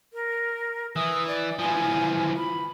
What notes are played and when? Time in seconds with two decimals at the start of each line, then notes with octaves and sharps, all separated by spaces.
0.13 A#4
0.96 E3 D#6
1.27 D5
1.59 E3 F3 G#5
2.37 B5